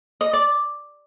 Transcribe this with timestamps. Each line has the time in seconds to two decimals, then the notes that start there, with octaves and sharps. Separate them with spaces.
0.21 D#5
0.33 D5